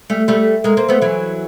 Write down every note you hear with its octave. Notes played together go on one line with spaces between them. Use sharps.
G3 A3
G3 A3
G#3 A#3
A#3 C4
A3 B3
E3 F#3